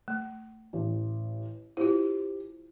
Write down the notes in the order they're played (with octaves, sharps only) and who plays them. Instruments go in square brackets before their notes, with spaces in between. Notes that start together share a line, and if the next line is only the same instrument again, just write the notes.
[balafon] A3
[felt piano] A1
[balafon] E4 F4 [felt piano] G4 C5